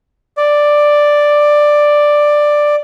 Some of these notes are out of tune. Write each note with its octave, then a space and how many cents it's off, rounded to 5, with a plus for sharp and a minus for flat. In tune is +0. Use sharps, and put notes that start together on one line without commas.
D5 +5